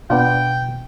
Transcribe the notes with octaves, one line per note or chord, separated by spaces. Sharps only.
B2 B3 D4 F4 G5